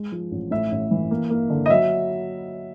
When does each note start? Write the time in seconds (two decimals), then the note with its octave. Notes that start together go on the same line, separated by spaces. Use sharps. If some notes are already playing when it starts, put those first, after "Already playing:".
Already playing: G#3
0.12 F3
0.32 A1
0.51 A2 E5
0.72 A1
0.91 E3
1.11 A#3
1.30 A#3
1.50 D3
1.66 D#5
1.70 F#3 E5